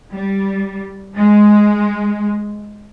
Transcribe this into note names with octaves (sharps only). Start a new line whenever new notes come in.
G3
G#3